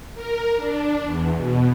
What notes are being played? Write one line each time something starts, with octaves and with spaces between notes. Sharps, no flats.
A#4
D4
E2
B2